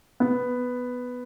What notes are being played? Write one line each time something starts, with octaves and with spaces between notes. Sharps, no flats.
B3